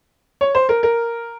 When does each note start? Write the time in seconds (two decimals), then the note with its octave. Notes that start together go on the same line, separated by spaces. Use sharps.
0.41 C#5
0.55 C5
0.69 A#4
0.83 A#4